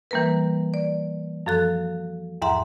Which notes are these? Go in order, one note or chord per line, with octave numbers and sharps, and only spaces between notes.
E3 G3 A#3 A#4 B4
D5
F#2 F3 A4 F#6
E2 G#2 E5 F#5 A#5 C6